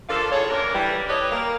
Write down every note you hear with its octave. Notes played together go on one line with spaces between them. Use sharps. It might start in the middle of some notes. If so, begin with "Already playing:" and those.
F3 A#3 D4 F4 A4
A2 G#4 A4 C#5
D2 A#3 C#4 D4 A#4
E3 G3
E4 G4 A4 B4 C#5 D#5
A#3